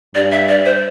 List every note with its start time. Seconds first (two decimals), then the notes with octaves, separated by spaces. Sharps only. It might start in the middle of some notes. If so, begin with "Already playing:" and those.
0.15 G2 D5
0.32 E5
0.48 D5
0.65 C5